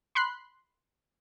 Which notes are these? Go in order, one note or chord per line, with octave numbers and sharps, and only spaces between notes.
B5 C6 F#6 C7